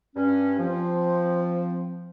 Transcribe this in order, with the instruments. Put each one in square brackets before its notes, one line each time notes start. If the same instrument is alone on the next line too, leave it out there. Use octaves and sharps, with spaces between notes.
[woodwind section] G2 C#4
[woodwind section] F3 [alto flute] C4